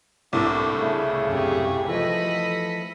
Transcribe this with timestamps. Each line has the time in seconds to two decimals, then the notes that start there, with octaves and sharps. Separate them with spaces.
0.33 C2 A2 D4 A4 A#4 D6
0.79 C#3 A3
1.29 F#2 C3 G4 G#4
1.88 E3 F3 A3 A4 D#5 B5